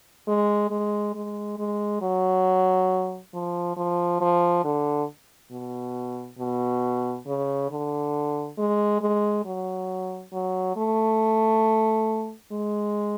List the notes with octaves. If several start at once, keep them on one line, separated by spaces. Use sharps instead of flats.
G#3
G#3
G#3
G#3
F#3
F3
F3
F3
D3
B2
B2
C#3
D3
G#3
G#3
F#3
F#3
A3
G#3